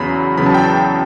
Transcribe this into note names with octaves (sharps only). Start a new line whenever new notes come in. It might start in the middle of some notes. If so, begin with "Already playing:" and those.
Already playing: E2 C#3 F#3 B3 B5
E2 C#3 F#3 B3 B5
A5
G5
A5